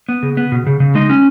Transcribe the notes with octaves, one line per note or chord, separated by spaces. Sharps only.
B3
C#3
B3
B2
C#3
C#3
G#3 D#4
C#4